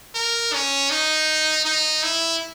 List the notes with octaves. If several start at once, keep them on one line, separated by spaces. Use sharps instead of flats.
A#4
C#4
D#4
D#4
E4